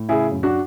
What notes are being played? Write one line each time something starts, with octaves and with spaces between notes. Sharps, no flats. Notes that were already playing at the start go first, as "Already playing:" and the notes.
Already playing: A2
C#3 E4 G#4
F#2
D4 F#4